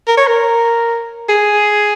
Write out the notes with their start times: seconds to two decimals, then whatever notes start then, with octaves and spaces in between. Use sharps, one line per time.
0.08 A#4
0.17 C#5
0.28 A#4
1.29 G#4